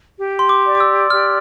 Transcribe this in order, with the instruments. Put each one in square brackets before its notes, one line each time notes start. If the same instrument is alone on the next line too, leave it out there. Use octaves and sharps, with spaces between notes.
[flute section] G4
[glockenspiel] C6
D6
[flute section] D5
[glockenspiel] D6
E6
[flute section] G4 [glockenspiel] F6